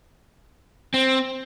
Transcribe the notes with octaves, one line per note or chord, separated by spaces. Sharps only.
C4